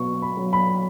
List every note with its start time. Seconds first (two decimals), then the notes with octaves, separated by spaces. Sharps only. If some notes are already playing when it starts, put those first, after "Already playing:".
Already playing: B2 F#3 C#6
0.22 B5
0.37 F#3
0.53 B5